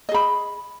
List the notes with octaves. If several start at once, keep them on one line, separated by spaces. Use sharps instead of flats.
G#4 D#5 B5